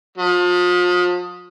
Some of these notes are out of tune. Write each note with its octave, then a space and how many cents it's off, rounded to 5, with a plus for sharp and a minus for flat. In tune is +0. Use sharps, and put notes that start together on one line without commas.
F3 +35